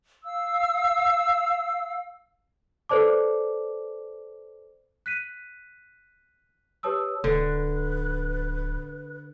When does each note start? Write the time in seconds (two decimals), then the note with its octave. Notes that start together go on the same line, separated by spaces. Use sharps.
0.25 F5 E6
2.89 A4 B4 C5 D5 A5 D6
5.06 F#6 B6 D#7
6.83 G4 B4 C#5 A5 D#6 E6
7.24 D1 D3 B4